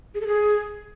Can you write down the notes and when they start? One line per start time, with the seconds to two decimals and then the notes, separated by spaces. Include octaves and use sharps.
0.14 G#4
0.21 A4
0.27 G#4